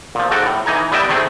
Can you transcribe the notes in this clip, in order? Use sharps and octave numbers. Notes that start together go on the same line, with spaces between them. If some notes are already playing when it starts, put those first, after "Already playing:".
A#2 F3
G#2 F#4 A4 G5
A2
E3 D#4 G#5 A#5
G3 B3 E4 D#5 G5 A5
C3 D#3 A3 C4 G#4